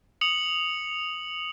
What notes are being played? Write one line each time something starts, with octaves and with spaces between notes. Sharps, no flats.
D#6 C#7 F7 F#7